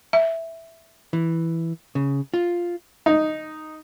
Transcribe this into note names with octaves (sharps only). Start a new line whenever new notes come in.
E5
E3
C#3
F4
D#4